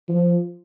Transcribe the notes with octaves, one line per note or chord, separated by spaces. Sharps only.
F3